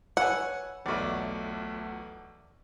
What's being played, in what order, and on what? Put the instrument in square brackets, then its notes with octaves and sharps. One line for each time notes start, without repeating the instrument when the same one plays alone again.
[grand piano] B4 C#5 G#5 [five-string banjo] F#5 [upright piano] E6
[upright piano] B1 E2 [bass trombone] A3 [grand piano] D5 E5 C#6